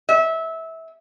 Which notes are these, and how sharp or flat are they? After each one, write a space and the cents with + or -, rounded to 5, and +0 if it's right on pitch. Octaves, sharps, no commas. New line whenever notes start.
E5 -20